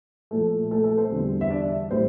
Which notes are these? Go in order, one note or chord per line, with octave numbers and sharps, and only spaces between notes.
A#2 F3 A3 A4
A3 A4
A3 A4
C4 C5
E2 D3 G3
E5
D4 D5
A2 G3 C4 C5